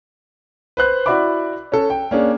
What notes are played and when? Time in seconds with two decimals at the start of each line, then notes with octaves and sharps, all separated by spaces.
0.77 B4 C5 F#6
1.06 E4 F#4 D5 E5 B5 D6
1.72 C#4 A4
1.90 G5
2.11 A#3 C#4 D4 G#4